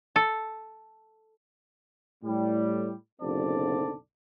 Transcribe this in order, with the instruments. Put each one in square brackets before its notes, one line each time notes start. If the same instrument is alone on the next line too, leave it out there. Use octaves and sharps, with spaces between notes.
[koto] A4
[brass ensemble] A2 G3
F#1 B1 D3 C4 D5 A5